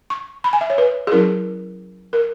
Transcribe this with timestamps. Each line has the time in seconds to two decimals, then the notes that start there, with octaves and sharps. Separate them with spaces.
0.10 C#6
0.44 B5
0.53 G#5
0.61 E5
0.70 C#5
0.78 B4
1.07 G#4
1.12 F#3 C#4 E4 A#4
2.13 A#4